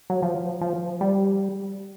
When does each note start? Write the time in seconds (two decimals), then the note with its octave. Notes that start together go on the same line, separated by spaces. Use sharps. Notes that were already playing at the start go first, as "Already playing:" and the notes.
0.10 F#3
0.22 F3
0.61 F3
1.01 G3